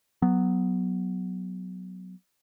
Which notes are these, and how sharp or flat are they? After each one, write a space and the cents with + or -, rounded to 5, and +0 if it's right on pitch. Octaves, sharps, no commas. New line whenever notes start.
F#3 +0 B3 +0